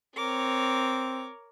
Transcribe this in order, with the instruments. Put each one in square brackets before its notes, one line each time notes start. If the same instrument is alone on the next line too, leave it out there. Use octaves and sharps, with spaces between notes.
[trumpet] C4 [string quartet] A#4 C#5 D6